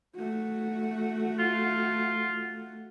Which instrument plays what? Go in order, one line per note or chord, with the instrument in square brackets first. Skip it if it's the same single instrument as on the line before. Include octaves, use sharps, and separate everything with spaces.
[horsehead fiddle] A3 F#4
[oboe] F4